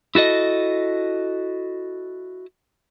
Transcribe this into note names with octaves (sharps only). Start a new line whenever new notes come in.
E4 F#4 A4 D#5